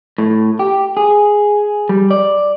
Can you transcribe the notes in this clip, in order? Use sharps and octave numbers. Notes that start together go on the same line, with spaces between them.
A2
G4
G#4
G3
D5